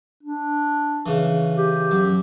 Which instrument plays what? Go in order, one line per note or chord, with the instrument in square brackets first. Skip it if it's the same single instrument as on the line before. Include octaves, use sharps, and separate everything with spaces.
[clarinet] D4
[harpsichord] C#3 E3
[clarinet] G4
[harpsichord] F#2